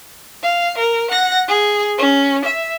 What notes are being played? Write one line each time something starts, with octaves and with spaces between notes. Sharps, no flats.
F5
A#4
F#5 A#6
G#4
C#4
E5